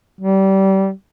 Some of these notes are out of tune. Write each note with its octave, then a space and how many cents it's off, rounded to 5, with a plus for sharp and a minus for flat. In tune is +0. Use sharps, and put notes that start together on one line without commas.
G3 -25